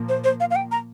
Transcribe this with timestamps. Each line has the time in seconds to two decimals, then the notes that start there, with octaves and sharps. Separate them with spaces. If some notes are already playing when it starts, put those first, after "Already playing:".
Already playing: A#2 F3 A#3
0.09 C5
0.24 C5
0.40 F5
0.51 F5
0.56 G5
0.72 A#5